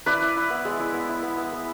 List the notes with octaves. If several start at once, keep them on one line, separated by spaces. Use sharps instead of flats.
E4 B4 D5
E4
E4
B3
G#3
E4
B3
E4
B3
B3
B3